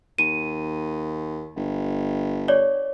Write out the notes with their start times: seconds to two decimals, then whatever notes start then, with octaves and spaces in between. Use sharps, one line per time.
0.18 D#2 D#7
1.56 G1
2.48 C#5 D5